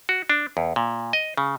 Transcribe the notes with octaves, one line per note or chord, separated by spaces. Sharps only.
F#4
D4
E2
A#2
D#5
C#3